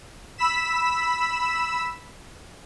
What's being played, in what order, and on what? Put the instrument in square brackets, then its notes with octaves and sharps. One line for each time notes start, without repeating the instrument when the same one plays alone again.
[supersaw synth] B5 E6 B6 E7